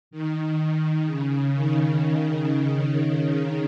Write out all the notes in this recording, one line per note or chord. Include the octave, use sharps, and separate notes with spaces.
D#3
C#3
D#3